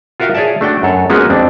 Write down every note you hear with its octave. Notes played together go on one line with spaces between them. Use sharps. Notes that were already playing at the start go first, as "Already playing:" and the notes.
F4 F#4 A#4 E5 F5 G5
G#4 C#5 D5 E5 A5
A3 D4 F#4 G5
F#2 A4 C#5
G#3 A#3 B3 C#4 F4 F#4
F2 C4 D4